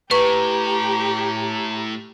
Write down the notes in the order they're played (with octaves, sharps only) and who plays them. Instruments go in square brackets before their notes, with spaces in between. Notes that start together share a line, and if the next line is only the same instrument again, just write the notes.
[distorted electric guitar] A2 [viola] G4 [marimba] B4 C#6 [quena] A#5